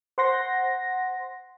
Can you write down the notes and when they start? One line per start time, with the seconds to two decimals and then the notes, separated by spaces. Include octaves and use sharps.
0.18 C5 F#5 C6 A#6